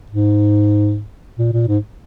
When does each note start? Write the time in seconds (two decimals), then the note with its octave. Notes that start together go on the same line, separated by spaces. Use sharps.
0.10 G#2
1.39 A#2
1.53 A#2
1.68 G#2